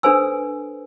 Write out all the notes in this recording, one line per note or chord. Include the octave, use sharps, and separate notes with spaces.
D4 A4 B4 C5 G#5 E6